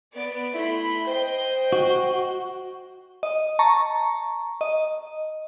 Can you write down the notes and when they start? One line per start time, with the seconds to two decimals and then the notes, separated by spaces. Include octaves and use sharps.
0.14 B3 D5 D7
0.55 A3 E4 B5 C6
1.07 C5 D#5 G5 G6
1.72 F#4
3.23 D#5
3.59 A5 A#5 C#6
4.61 D#5